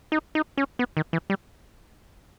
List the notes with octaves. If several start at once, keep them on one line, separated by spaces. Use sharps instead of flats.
D#4
D#4
C#4
B3
D#3
E3
G3